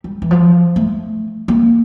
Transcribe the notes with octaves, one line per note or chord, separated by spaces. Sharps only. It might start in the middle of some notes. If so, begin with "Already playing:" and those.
G3
E3
F3
A3
A#3